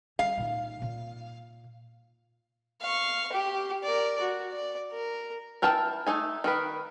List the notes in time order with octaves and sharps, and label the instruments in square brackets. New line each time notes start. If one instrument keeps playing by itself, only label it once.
[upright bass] G3 [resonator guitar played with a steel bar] F5
[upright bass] A#2 D#4
A#2
[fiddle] F5 C#6
G4
A#4 D5
F#4
D5
A#4
[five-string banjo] E3 A#4 G5 A5
A3 D#4 G#5
D#3 A#4 B4